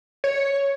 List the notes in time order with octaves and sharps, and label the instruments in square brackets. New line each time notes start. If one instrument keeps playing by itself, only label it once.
[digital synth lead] C#5